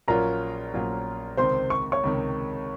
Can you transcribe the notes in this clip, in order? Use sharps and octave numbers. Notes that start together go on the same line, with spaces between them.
A#1 A#2 F#3 C#4 F4 A#4 A#5
A#1 A#2 F#3 C#4 F4
C#2 C3 D#3 C5 C6
C#6
C#5 C#6
C#2 C3 D#3